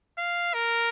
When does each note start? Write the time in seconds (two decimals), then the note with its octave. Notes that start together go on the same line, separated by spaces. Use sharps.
0.18 F5
0.54 A#4